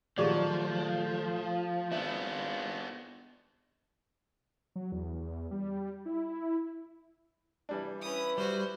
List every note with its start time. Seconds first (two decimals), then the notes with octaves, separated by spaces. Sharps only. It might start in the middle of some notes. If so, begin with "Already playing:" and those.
0.18 A#2 D#3 F3 F#3 A3 G4 G#4 D5
1.92 G#1 B3 D4 E5
4.76 F#3
4.92 E2
5.51 G3
6.06 E4
7.69 E3 G3 D4
8.02 C#4 E4 B4 D#6
8.38 G3 F#4 C5